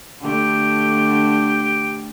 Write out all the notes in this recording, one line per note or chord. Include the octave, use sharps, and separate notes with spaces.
D3 A3 G4